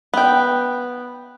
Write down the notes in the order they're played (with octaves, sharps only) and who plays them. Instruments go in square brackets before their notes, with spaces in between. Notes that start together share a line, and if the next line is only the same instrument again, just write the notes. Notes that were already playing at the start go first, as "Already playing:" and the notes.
[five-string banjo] B3 G5